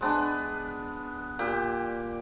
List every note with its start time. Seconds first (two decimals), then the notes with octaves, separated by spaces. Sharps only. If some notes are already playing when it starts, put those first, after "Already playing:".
0.01 G#3 B3 D4
1.39 A#2 G4